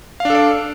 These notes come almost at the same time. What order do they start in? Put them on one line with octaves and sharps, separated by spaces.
F5 D4 A4 D5